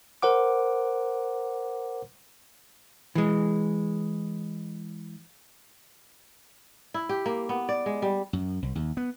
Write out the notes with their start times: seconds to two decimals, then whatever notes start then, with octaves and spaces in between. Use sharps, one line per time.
0.22 A#4 C5 F#5 D6
3.15 E3 G#3
6.94 E4
7.09 G4
7.26 A#3
7.49 B3
7.69 D5
7.86 G#3
8.02 G3
8.33 F#2
8.62 C2
8.75 D#2
8.97 B3